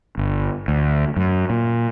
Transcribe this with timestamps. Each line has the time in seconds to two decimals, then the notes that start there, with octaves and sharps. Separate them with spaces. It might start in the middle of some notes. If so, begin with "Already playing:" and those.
0.17 G1
0.68 D2
1.17 F#2
1.50 A#2